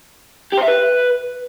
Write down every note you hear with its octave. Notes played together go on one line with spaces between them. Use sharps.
G4
C5
E5
B4